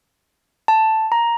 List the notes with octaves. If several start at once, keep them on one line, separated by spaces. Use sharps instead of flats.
A5
A#5